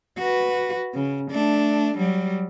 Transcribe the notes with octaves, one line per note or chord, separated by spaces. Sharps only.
F#4 B4
C#3
A3 D4
F#3 G3